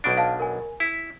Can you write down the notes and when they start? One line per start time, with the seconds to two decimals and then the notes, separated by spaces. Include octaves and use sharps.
0.04 B1 B2 D4 D7
0.17 F5 A5
0.40 A#4 G#5
0.80 E4 B6